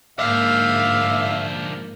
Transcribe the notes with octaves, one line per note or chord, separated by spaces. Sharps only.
G#2 D3 F3 A#3 E5 F5